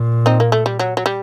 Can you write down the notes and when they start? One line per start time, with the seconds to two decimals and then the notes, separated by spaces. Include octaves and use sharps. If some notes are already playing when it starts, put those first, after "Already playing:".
Already playing: A#2
0.26 C4 D#4
0.40 A#3
0.52 A3
0.66 G3
0.79 F#3
0.97 F#3
1.06 G3